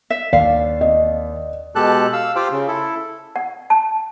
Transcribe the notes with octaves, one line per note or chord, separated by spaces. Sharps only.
E5
D#2 D5 F5
D#5
B2 G#3 G4 A4 A5 F#6
F5 E6
F4 G4 C5 F5 G5
C#3
E4 A4
F#5
A5